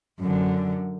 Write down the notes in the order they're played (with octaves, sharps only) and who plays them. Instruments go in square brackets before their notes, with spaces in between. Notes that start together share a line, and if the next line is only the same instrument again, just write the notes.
[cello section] F#2 D3